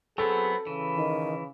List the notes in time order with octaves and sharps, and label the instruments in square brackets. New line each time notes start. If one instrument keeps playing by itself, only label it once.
[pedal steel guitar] F#3 B3 C4 [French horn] G#4 [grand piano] A4
[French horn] C#3 [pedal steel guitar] E3
[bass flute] D#3